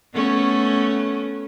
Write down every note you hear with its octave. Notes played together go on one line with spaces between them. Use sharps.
A3 B3 C#4